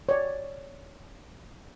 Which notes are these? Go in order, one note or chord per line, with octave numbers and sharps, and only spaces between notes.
C#5 D5